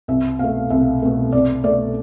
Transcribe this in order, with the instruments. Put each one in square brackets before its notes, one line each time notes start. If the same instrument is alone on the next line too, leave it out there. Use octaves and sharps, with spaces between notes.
[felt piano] C2 E5
B2 A3 F5
C2 E5
B2 A3
C2 D5
B2 A3 D5